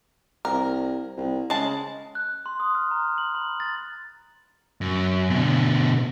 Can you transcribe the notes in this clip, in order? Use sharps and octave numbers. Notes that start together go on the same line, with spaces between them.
C2 A#4
C2
C#3 G#3 A5
F#6
C6
D#6
F6
A#5
F#7
B5
A6
F#2
B2 D3